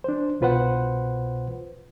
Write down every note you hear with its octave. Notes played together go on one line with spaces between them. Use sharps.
D4 C5
C2 B2 F4 B4 C5 F#5